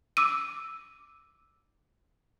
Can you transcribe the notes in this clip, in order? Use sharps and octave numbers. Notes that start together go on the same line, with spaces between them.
D6 E6 D#7